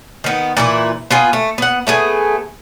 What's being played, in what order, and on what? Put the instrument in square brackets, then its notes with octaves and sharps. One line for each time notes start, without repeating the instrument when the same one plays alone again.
[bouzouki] D#3 B3
A#2 E3 E4
B3 F4 G#4
A3
B3 F#5
A3 B3 G#4